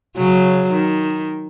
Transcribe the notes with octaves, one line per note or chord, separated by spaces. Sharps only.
C#3 F#3
D#3